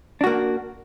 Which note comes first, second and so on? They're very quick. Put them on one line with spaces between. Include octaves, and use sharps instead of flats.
D4 F#4 A#3